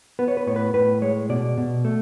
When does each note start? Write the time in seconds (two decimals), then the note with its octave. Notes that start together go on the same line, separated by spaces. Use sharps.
0.19 B3 B4
0.28 C#5
0.37 B4
0.47 A2 C#5
0.56 B4
0.74 A2 B4
1.02 G#3 C#5
1.29 B2 D5
1.57 B2
1.85 A3